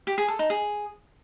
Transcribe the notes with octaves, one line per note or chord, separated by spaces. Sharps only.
G4
G#4
A4
D#4
G#4